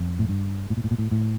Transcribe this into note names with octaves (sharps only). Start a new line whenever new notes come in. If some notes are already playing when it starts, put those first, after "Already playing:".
Already playing: F2
A2
G2
A2
A#2
A2
A#2
A2
A2